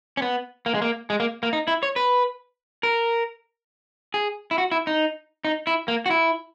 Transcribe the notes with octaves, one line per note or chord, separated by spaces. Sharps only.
C#4
B3
A#3
G#3
A#3
G#3
A#3
A#3
D#4
E4
C#5
B4
A#4
G#4
E4
F#4
E4
D#4
D#4
E4
A#3
F#4
E4